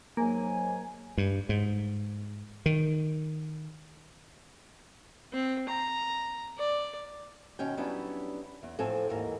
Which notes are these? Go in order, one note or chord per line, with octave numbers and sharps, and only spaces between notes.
G#2 F#3 A#3 G#5
G2
G#2
D#3
C4
A#5
D5
B2 D#3 C#4 G5
F#3 G3 B3 C#4 D4 E4
E2
A2 F3 C4 A4 G#5
D#2 G#2 E3 A#4